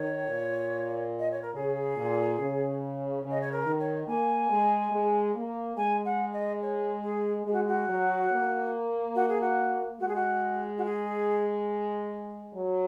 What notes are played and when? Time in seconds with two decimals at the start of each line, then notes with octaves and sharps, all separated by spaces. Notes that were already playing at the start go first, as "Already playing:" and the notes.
Already playing: D#3 C#5
0.27 A#2
1.19 D#5
1.31 C#5
1.42 A#4
1.54 C#3 G#4
1.96 A#2
2.39 C#3
3.23 C#3
3.30 D#5
3.41 C#5
3.52 A#4
3.66 D#3
3.80 C#5
4.07 A#3 G#5
4.50 G#3
4.92 G#3
5.35 A#3
5.77 G#3 G#5
6.05 F#5
6.33 D#5
6.62 C#5
7.03 G#4
7.46 G#3 G#4
7.53 F#4
7.67 F#4
7.89 F#3
8.31 A#3
9.15 F#4
9.28 G#4
9.41 F#4
10.00 G#3 F#4
10.08 G#4
10.15 F#4
10.78 F#4
10.84 G#4
12.53 F#3